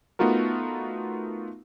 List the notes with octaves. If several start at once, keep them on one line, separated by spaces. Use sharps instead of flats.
A3 B3 D#4 F4 F#4 A#4